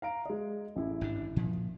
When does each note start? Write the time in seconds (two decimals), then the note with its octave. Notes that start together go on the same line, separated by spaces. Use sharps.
0.02 F5 A#5 D7
0.26 G#3 D#5
0.76 A1 E4
1.01 G#1 G#2 D4
1.36 A#2 F3